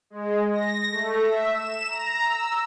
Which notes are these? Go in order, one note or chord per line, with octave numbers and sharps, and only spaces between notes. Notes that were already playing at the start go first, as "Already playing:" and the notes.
G#3
A#6
A3
E5
E7
A#5
E6